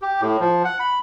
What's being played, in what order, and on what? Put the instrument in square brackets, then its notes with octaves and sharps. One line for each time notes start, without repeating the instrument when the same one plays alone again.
[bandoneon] G4
A2
F3
F#5
B5